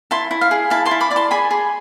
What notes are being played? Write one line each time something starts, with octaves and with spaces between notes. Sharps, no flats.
E4 A5 C6
E4
F5
G#4
E4 F5 A5
A5 C6
E4
B5 D6
D5 D6
A5 C6
G#4 G#5 B5
G#4